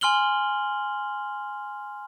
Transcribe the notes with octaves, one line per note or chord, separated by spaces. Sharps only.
G#5 C6 F6 F#7 G7